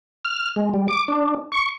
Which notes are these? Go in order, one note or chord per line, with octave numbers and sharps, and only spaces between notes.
F6
G#3
G3
D6
D4
C#6